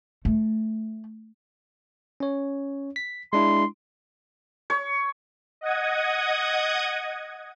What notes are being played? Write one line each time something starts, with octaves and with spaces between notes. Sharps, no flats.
A3
C#4 C#5
B6
G#3 D4 E4 C6
C#5
D#5 F#5 D#6 G#6